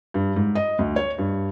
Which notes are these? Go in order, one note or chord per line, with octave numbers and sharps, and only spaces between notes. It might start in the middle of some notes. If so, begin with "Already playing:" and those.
G2
G#2
D#5
D2
C#5
G2